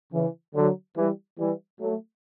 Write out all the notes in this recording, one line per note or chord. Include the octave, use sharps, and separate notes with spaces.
C#3 E3
D3 F#3
E3 G3
E3 G3
F#3 A3